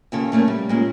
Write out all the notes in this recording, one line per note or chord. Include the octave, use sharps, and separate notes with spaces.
D#2 C#3 A4
A#2 A3 A#3 C#4
G3
A#2 G#3 C#4